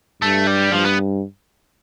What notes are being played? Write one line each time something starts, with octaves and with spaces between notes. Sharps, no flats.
G2 A3
G3
G2 F3
B3